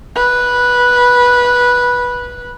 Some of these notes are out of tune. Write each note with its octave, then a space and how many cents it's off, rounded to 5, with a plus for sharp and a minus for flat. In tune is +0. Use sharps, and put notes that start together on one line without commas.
B4 -10